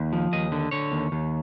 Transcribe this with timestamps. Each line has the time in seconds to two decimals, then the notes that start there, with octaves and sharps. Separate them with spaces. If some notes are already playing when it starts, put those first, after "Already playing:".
Already playing: D#2
0.13 F3
0.32 D#2 D#5
0.52 D3
0.71 D3 C#5
0.92 D#2
1.12 D#2